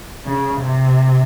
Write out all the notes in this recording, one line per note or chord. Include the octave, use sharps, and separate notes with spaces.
C#3
C3